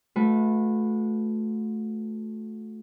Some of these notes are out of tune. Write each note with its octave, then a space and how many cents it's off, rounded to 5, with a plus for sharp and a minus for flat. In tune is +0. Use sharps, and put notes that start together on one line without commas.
A3 -15 F#4 -40 B4 +0